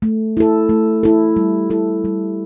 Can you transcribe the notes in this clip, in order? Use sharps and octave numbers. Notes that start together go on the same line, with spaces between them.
A3
E4 A4
A3
E4 A4
G3
E4 A4
G3